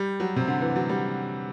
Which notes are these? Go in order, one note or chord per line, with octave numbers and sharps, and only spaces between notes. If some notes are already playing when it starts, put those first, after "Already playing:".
Already playing: G3
F#3
C3
D3
E3
F#3
G3